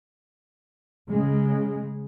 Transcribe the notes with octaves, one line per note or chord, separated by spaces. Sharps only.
C#3 G#3